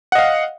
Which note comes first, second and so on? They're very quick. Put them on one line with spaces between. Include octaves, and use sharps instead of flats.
F#5 D#5 F5